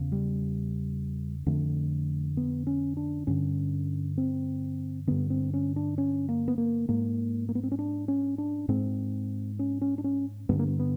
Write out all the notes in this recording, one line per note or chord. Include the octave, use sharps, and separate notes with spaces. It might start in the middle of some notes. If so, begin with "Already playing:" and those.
Already playing: E2 C#3
G3
F2 D3 A3
B3
C#4
D4
G2 D3 C#4
C4
G2 D3 B3
C4
C#4
D4
C#4
A#3
B3
A#3
G#2 A#3
A#3
B3
C4
C#4
D4
C#4
D4
G#2 C4
C#4
C#4
D4
C#4
G2 D3 B3
A#3
B3
B3